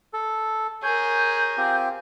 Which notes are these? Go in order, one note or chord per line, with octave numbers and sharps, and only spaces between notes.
A4
G#4 A#4 C#5 G6
C4 F4 G4